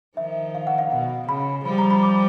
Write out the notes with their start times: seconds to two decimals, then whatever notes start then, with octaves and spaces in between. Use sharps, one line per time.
0.17 D#3 F3 E5
0.55 F5
0.67 F#5
0.78 F5
0.91 B2 F#5
1.28 C#3 B5
1.65 F3 G3 B5
1.78 A#5
1.91 B5
2.03 D6